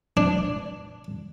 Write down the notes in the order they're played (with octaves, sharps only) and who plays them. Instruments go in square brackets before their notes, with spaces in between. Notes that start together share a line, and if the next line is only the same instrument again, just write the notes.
[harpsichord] D4